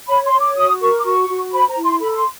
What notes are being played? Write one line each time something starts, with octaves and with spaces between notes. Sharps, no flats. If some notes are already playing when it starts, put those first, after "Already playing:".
C#5 B5
C6
C#5
D6
F#4 D#6
A#4 C#6
D6
F#4 C#6
F#4
C5 B5
A#5
E4
C6
A4 B5
B5
C6